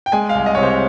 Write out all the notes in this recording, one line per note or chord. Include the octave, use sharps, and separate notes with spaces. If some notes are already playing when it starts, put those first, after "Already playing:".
G5
G#3 G#5
F5
C2
D#5
C3 C#5
C5